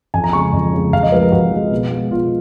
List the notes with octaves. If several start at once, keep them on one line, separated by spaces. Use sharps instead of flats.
F2 G#5
A#5
C#3 G#3 C#6
F2
C#3 G#3
F2 F5
D#5
F3 G#3 B4
A#4
F2 F#4
F3 G#3
B2
G#3
B2 F4